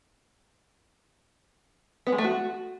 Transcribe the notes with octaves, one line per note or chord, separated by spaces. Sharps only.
B3
G#3
A3
F#4